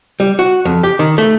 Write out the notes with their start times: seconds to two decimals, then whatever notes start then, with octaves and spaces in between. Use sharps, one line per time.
0.20 G3
0.39 F#4
0.65 F2
0.83 G4
0.99 D#3
1.18 A3